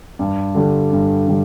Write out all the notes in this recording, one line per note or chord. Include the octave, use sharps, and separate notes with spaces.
G2
D3 G3 D4
G2
D3 G3